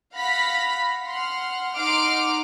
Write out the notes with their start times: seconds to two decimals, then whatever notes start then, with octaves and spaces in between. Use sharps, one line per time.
0.13 F5 F#5 B5 A#6 B6
1.05 F#5 C6 F6
1.75 D#4 F#5 C6 D6 F6 D7